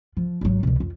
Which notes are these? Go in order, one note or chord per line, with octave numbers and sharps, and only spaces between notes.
F3
G#1 F#3
C2 B2
F2